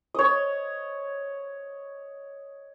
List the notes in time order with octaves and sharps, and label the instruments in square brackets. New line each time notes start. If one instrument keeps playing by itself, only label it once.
[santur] C#5 D#5